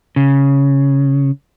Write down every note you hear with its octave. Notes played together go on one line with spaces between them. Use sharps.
C#3